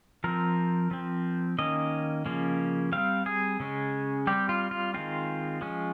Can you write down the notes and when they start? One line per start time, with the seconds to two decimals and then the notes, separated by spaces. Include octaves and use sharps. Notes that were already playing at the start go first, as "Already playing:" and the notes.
0.24 F3 C4 A#4
0.91 F3 C4
1.59 D#3 A#3 C#4 D#5
2.26 C#3 F3 A#3 C#4
2.92 G3 C4 F5
3.26 G#4
3.60 C#3 G#3 C#4
4.27 G3 C4 G4
4.49 F4
4.71 F4
4.94 D#3 G#3 C4 F4
5.61 F3 G#3 C#4